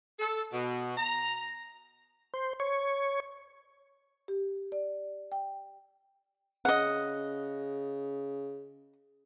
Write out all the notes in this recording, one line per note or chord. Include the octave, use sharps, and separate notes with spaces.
A4
B2
A#5
C5
C#5
G4
D5
G5
C#3 D#5 F#5